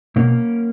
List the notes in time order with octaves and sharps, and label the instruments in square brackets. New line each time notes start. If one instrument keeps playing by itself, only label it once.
[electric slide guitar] B2 A#3 C#4